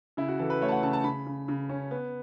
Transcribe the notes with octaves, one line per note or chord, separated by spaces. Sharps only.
C#3 E4
F#4
E3 A4
B4
A3 C#5
A5
F#5
C#3 A5
A5
C#3 B5
C#3
C#3
C#4
B3